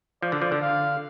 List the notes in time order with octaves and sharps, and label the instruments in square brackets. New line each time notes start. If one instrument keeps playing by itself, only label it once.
[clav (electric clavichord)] F3 [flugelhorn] D5
[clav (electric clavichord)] D3
F3
D3
[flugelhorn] F5